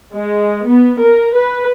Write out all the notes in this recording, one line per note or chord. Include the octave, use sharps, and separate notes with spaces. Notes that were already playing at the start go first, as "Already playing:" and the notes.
G#3
B3
A#4
B4